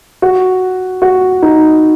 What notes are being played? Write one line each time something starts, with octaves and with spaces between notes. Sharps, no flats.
F#4
F#4
D#4